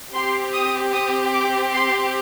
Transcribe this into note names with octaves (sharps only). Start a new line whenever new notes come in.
C4 G4 C6
D#6
D#6
D6
C6